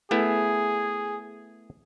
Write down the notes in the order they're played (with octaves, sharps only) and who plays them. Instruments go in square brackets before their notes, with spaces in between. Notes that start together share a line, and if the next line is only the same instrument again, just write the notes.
[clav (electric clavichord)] A3 B3 E4 [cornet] G#4